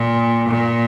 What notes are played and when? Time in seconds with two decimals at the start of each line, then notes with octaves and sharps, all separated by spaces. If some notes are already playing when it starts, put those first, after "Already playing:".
Already playing: A#2
0.49 A#2